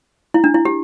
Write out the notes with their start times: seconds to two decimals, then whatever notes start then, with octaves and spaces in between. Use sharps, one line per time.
0.34 E4
0.44 D4
0.54 E4
0.65 G4